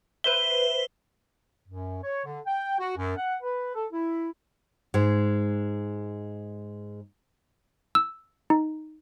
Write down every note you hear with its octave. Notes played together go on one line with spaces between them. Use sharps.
B4 C5 E5 G7
F#2
C#5
D3
G5
F#4
F#2
F#5
B4
A4
E4
G#2 G#3
E6
D#4